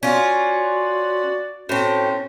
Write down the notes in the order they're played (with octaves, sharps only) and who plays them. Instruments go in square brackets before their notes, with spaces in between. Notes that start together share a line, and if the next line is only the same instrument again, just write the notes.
[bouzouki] C#4 F4 [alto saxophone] F#4 [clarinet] D5
[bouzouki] A2 C4 [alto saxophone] C#4 [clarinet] F#4